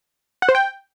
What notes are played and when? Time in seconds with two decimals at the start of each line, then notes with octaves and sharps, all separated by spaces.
0.42 F#5
0.49 C5
0.55 G5